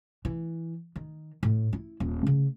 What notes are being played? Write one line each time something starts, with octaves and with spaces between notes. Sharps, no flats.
E3
D#3
A2
E4
D#1
C#3